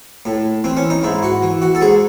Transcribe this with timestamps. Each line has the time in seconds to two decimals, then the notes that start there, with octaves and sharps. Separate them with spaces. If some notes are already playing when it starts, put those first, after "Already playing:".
0.25 A2
0.64 E3 C4
0.77 C#4
0.90 D#4
1.03 G#2 E4
1.23 F#4
1.42 E3
1.62 F#4
1.75 A4
1.81 G#2 G#4